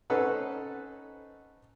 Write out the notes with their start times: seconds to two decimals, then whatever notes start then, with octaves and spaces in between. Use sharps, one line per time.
0.10 C#4 D#4 A4 B4 C5 F#5